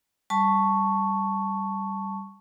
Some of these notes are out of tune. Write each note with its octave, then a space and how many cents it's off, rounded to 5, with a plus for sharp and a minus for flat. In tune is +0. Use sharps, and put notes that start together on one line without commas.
G3 +0 A5 +0 C#6 +0